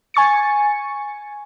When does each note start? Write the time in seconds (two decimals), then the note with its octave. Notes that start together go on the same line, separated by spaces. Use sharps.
0.14 G#5 C#6 A6 C#7